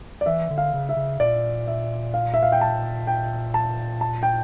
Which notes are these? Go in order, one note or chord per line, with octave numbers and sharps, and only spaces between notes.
D5
E3 E5
D3
F5
C#3
E5
C#3
A#2 D5
E5
F5
E5
F5
G5
A5
G5
A5
A5
G5